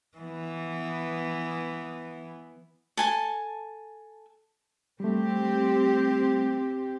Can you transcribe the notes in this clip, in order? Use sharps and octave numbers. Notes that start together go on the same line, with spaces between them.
E3 B3
A4 G#5 A5
G3 A3 C4 G4